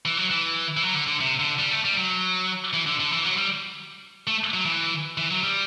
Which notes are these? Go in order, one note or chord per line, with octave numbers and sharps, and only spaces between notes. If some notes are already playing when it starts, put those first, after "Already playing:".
E3
F#3
E3
E3
F#3
D3
D3
C3
D3
G3
A3
G3
F#3
E3
D3
D3
E3
F#3
G3
A3
F#3
E3
E3
F#3
G3